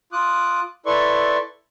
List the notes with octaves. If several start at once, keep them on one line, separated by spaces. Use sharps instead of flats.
F4 D6 D#6 F#6
E4 A4 B4 D5 C6 C#6